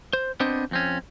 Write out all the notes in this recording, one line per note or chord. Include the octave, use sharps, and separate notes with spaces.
C5
B3 C4 D4 C5 D#5
F2 C4 C#4